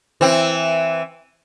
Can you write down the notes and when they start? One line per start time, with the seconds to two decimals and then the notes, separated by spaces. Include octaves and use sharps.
0.21 E3 C4